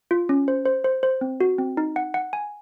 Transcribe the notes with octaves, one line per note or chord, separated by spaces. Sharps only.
F4
C#4
C5
C5
C5
C5
C4
F#4
C4
D#4
F#5
F#5
G#5